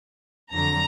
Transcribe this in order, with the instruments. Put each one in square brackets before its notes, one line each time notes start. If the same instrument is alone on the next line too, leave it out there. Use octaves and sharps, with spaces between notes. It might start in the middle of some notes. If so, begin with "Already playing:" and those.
[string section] F2 D3 F#3 A#5